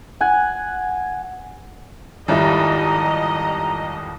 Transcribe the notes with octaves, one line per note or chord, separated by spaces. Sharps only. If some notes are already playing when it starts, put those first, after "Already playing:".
F#5 G#5
G#1 F2 G3 D#4 E4 G4 D#5 A#5